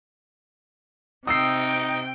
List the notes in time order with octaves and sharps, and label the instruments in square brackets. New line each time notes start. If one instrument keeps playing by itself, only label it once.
[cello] C3 G5 [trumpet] D#4 [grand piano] D#6 E6 C7